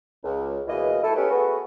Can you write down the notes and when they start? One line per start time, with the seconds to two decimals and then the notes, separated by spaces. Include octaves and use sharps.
0.24 C#2
0.68 C#2 B2 E3 G#3 A#3 D#5
1.03 A3 E4 A4
1.16 B3 C#4 G4 A4 B4
1.30 A3 B3 F#4 G#4 B4